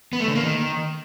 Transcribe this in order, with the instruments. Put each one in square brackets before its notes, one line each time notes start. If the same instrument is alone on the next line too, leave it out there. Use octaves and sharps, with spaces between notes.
[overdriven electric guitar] B3
A3
D3
A#3
D#3